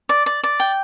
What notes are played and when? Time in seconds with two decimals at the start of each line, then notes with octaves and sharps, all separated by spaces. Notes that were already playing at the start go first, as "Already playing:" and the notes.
0.09 D5
0.26 D5
0.43 D5
0.60 G5